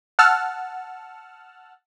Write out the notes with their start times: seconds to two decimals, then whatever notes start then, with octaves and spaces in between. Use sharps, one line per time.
0.19 F#5 A5 E6 F6